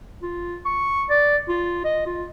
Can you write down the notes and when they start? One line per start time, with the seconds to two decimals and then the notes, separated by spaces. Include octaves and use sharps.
0.22 F4
0.65 C#6
1.09 D5
1.49 F4
1.84 D#5
2.06 F4